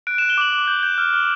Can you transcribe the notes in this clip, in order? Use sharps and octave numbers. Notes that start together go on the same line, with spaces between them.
F#6 D7
E7
F#6
G7
D6 F#7
D6
G6
G6
F6
F6